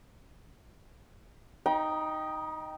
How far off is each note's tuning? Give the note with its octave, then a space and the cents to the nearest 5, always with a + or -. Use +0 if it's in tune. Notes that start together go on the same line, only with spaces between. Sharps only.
D#4 +0 G5 +0 A#5 +40